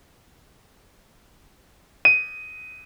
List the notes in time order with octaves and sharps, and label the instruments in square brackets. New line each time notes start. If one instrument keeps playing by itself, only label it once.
[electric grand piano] D#7